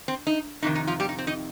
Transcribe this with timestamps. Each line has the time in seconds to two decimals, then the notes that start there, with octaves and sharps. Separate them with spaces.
0.08 C4
0.27 D#4
0.63 F2 C3 D#3 D#4
0.75 D#4
0.87 F3 F4
1.00 G3 G4
1.09 D#4
1.19 C4
1.27 D#4 D#5